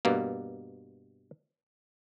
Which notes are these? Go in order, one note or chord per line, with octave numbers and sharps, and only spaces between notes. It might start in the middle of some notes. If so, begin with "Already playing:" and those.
G2 B2 A#3